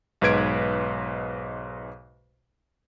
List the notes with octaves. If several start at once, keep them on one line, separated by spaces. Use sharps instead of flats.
B1 G#2 B4 G#6 D7